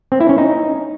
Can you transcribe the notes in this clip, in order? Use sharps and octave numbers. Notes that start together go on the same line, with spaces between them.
C4
E4
C#4
D#4